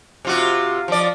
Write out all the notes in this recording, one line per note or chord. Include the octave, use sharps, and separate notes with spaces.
C3 F4 F#4
F3 D5